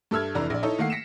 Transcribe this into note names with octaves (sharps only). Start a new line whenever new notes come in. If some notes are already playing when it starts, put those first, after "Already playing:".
G2 A4 E5 E6 F6 G#6
F1 E3 D4 E4 A#5
A#1 D5
D#4 E4 A4 C#5 D#5 E5
D#3 A3 A#3 F5 F#5 C7
A#6 B6 C#7 D7 E7